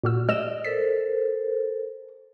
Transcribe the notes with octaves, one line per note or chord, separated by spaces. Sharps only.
A#2 F#4 E6
D5 D#5 E6 E7
A4 A#4 C5 B6